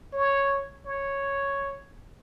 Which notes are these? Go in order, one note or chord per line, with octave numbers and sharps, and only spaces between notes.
C#5
C#5